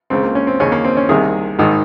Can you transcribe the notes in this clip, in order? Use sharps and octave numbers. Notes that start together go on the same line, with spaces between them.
C#2 C#3 C4
A#3
C#4
C4
D#2 C#3 C#4
A#3
C4
C#4
C2 C3 D#3 G#4
G#1 G#2 D#3